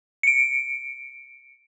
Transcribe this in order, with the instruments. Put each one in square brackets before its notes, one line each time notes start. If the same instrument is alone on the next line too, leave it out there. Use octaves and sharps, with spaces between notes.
[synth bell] C#7 D7